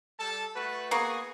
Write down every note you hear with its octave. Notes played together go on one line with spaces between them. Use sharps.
G3 A4 A5
A3 F#4 B4
A#3 B3 F#4 G#4